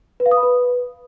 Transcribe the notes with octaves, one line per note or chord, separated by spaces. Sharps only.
B4
F5
D#6
B5
B4